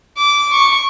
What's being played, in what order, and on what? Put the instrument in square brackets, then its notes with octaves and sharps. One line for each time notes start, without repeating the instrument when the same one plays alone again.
[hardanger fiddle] D6
C#6